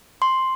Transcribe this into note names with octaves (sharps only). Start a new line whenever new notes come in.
C6